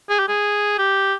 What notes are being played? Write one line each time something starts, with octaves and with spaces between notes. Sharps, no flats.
G#4
G4
G#4
G4